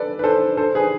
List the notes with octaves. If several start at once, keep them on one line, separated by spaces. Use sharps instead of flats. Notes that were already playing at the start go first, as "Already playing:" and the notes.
Already playing: A4 B4 D5
B4
A4 C5
A4 C5
G#4 B4